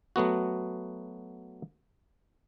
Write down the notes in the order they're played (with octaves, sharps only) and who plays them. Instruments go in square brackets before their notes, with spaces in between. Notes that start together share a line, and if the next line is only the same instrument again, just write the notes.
[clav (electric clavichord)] F#3 A3 B3 F#4